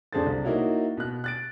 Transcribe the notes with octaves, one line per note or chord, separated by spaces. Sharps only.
F2 D4 G#4 A4 C5 A6
C2
A#3 D#4 E4 F#4 C#5
B2 F#6
F#6 A6 D7